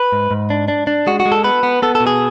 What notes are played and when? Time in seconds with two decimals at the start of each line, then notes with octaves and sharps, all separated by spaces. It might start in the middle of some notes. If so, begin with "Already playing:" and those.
Already playing: B4
0.12 G#2
0.31 G#2
0.50 D4
0.68 D4
0.87 D4
1.07 G#3 F#4
1.20 F#4
1.26 G#3
1.32 A4
1.44 B3 B4
1.63 B3
1.82 B3 A4
1.95 A4
2.00 B2
2.07 G#4